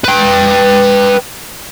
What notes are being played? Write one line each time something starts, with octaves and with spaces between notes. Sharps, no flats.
B4 G5